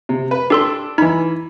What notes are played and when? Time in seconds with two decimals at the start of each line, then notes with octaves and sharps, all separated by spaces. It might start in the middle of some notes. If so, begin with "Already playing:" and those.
0.09 C3
0.31 B4
0.50 D4 G4 A4 C6
0.98 E3 D#4 B5